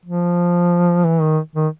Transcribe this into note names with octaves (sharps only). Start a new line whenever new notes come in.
F3
E3
D#3
D#3